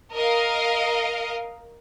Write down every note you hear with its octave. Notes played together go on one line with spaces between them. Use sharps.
A#4 D#5 F5